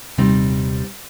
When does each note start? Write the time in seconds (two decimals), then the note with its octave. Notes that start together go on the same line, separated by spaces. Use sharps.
0.18 D#1 C3 G3 C4 D#4